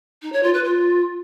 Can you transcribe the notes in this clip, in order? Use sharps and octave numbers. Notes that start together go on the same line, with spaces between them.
D#4
C#5
F4
B4
F4